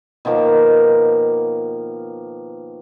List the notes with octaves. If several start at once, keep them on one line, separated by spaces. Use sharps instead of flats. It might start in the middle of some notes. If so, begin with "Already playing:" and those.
B2 D#3 F3 A#3